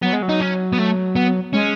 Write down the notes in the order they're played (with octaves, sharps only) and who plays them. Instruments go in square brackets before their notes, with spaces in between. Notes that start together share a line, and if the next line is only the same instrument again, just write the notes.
[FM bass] F#3 [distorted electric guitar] B3
[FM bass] G#3
F#3
[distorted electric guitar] D#4
C#4
B3
A3
B3
[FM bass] G#3 [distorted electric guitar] C#4